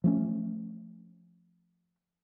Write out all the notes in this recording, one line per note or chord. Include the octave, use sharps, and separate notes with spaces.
F3 A3 C#4